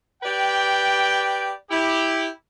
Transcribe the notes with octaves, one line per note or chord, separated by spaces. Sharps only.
G4 B4 D5 G5
E4 G4